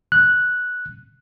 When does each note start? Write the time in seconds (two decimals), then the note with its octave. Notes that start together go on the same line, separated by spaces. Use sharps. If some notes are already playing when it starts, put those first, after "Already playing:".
0.12 F#6